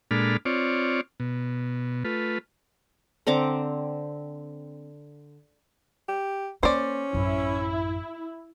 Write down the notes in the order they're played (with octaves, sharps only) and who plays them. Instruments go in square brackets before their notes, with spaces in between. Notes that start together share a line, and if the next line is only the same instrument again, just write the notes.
[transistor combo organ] A#2 G#3 D4 A4 B5 F6
C4 F4 C#5 D5
B2
A3 F4 B4
[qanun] D3 C4 A#5 D6
[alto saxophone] G4
[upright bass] A#3 [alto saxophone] C#4 [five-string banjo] C5 D5
[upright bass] A1 F#2 [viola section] E4